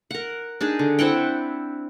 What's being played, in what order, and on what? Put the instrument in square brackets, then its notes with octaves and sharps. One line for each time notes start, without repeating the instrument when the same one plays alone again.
[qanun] A#4 F#5
D4 D#4 G#4
D3
C4 E4 F#5 G5